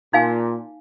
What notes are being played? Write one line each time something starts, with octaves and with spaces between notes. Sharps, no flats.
A#2 D#4 F5 G#5